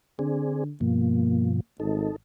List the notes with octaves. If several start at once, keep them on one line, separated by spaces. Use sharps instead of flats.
D3 C4 D4 G#4
G2 B2 F3 A#3
G#1 D#4 A4